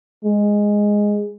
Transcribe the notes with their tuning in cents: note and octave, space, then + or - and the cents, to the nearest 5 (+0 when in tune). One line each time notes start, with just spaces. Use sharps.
G#3 -5